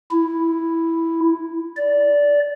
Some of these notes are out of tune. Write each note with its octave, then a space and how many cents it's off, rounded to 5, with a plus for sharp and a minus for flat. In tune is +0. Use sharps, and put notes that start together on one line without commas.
E4 +0
D5 -15